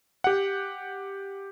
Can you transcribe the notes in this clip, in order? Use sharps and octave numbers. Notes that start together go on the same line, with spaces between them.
G4 F#5